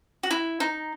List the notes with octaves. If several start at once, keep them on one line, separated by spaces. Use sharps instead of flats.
F#4
E4
D#4